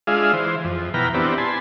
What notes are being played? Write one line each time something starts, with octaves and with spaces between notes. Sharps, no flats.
G#3 D4 F4 G#4 E5 F5
E3 C5
F2
B2 E3 G5 A#5 B5 F6
B3 C4 D4 E4 G4
G#5 A5 B5 C6